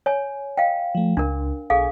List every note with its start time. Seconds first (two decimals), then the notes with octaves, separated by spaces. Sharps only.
0.06 C#5 G#5
0.57 D#5 F5 G5
0.95 F3 A3
1.17 C#2 D4 A#4
1.70 B1 G#4 A4 F5 G#5